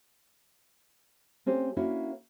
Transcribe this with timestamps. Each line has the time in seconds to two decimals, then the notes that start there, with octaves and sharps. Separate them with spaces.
1.46 A3 C4 C#4 G4 C5
1.76 A#3 C#4 D4 E4 F#4 C#5